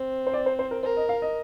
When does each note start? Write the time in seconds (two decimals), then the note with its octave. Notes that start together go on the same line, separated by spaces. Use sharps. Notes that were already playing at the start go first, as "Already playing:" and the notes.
Already playing: C4
0.27 C5
0.34 D5
0.46 C5
0.59 C5
0.71 A#4
0.83 A#4 C5
0.97 D#5
1.09 F5
1.22 D#5